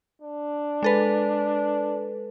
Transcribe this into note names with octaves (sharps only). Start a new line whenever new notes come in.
D4
G#3 A4 B4